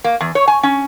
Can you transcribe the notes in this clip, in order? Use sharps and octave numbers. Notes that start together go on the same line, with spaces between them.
A#3
E2
C#5
G#5
C#4